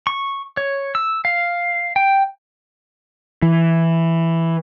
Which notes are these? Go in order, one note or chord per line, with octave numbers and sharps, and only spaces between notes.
C#6
C#5
E6
F5
G5
E3